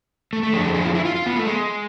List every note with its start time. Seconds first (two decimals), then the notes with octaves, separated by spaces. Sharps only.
0.33 A3
0.43 A3
0.53 F2 D3 F3 G#4
0.64 A4
0.74 G#4
0.84 F4
0.95 E4
1.05 F4
1.15 F4
1.26 B3
1.36 A3
1.47 G#3